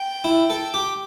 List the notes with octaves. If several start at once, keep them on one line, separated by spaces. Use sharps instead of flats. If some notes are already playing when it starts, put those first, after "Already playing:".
Already playing: G5
E4
A4
G4